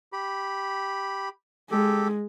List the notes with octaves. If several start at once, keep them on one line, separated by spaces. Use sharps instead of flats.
G4 B5
G#3 G4 A4